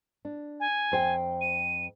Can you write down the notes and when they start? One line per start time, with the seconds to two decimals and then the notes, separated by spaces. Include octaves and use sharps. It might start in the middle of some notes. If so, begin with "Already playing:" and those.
0.25 D4
0.60 G#5
0.92 F2 C5 G5
1.41 D#7